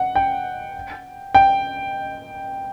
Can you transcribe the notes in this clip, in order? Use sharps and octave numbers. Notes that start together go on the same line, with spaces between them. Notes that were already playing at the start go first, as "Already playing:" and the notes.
Already playing: F#5
G5
G5